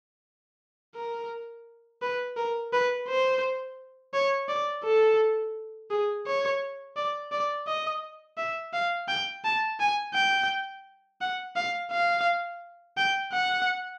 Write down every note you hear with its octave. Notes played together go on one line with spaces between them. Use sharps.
A#4
B4
A#4
B4
C5
C#5
D5
A4
G#4
C#5
D5
D5
D#5
E5
F5
G5
A5
G#5
G5
F#5
F5
F5
G5
F#5